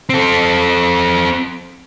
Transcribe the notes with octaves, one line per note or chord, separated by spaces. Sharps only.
C4 A4